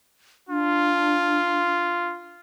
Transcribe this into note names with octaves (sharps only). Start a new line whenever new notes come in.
D4 F4